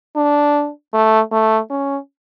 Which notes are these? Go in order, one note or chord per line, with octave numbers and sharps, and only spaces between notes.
D4
A3
A3
C#4